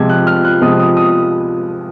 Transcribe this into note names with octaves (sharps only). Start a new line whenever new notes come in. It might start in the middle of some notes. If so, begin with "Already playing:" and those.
Already playing: C3 F3 G#3 G#6
F#6
F6
F#6
C3 F3 G#3 D#6
D#6
D#6